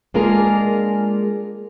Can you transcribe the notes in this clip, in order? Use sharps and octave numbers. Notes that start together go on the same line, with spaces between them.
G#3 A#3 D4 F4 G#4 A#4